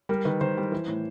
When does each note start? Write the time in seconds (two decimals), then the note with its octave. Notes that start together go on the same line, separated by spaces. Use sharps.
0.09 G3 A#4
0.25 D#3 B4
0.41 D#3 C5
0.57 G3
0.72 E3
0.88 A2